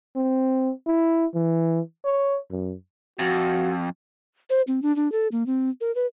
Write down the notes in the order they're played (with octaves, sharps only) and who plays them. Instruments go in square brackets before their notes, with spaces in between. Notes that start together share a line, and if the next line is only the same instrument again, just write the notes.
[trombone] C4
E4
E3
C#5
F#2
[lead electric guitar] F2 [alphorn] F#4
[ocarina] C5
C4
D4
D4
A4
A#3
C4
A#4
B4